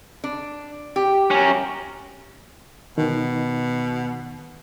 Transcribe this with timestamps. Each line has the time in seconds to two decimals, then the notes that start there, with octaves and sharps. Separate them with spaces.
0.24 D4
0.96 G4
1.31 C#4 A#4
2.98 B2 D#3